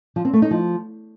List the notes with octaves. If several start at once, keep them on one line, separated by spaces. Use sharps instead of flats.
F3
C4
A3
D#4
F3